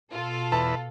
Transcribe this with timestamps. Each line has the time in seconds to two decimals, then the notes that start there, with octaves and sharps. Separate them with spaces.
0.12 B2 F4 A4
0.52 E2 B4 E5 A5